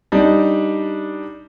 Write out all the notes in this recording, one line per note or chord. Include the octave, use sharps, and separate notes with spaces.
G3 D4 D#4